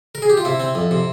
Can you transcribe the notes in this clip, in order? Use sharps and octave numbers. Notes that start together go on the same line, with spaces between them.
A#4
G#4
G4
F4
C3 E4
C4
F2
C3